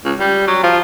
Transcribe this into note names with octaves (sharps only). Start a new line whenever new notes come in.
C#2
G3
F#3
F3